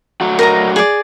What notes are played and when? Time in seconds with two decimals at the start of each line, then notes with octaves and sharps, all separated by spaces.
0.21 F#3 A3 F#4
0.39 A#4 D#5 A#5
0.76 G#4 D5